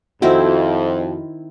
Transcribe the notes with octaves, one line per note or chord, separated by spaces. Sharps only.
F2 D#3 C4 E4 F#4